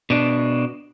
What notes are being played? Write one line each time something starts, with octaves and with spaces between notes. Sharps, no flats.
B2 D4